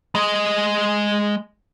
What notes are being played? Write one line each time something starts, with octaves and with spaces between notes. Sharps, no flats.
G#3 D#5